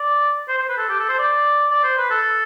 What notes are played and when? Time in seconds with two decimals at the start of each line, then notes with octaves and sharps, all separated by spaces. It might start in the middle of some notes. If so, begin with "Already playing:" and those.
Already playing: D5
0.48 C5
0.58 C5
0.68 B4
0.78 A4
0.89 G4
0.99 A4
1.09 C5
1.19 D5
1.71 D5
1.84 C5
1.98 B4
2.10 A4